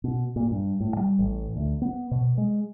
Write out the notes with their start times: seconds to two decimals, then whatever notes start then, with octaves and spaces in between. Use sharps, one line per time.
0.04 B2
0.36 A#2
0.51 G2
0.80 A2
0.97 G3
1.19 A1
1.56 D2
1.82 B3
2.11 B2
2.38 G#3